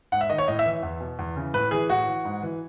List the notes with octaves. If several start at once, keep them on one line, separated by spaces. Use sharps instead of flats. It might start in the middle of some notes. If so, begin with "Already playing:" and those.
G#2 F#5
E5
D#3 D#5
C#5
A2 D#5
E5
E3
E2
B2
E2
C#3 E3
A2 B4
E3 G#4
A2 F#4
E3
G#2
E3